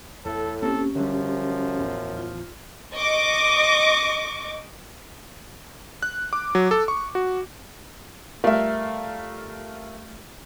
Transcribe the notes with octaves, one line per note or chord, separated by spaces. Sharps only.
E2 A2 A4
D1 A#3 C4 C#4 G4 A4
F#2 D3 F3 G3
D1 A1 E2
F4
D#5 C#6 D6
F#6
D6
F#3
A4
C#6
F#4
G3 A3 F4 A#4 E5